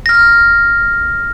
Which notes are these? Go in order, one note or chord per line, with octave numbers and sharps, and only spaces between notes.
F6 A#6